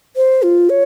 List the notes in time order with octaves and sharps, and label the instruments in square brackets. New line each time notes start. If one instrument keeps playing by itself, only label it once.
[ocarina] C5
F4
C#5